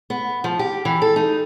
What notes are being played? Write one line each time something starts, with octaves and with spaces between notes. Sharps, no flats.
B3
F3
G4
E3
A4
D#4